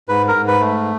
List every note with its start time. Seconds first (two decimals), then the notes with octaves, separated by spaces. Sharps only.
0.09 G#2 B4
0.28 A#4
0.35 G#2
0.48 B4
0.60 A3